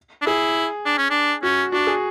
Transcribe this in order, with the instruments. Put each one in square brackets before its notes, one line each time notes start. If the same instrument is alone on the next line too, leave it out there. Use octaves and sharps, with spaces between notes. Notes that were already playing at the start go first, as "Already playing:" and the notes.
[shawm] D4
[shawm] E4 [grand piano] G#4
[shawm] D4
C#4
D4
[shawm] C#4 [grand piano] F#4
[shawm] D4 [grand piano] F#4
[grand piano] G#4